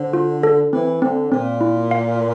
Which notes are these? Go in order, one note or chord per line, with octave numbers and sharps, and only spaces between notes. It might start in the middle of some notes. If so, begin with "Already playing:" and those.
Already playing: D3 C5
F4
A4
E3 C4
D3 C4
A#2 C4
E4
F5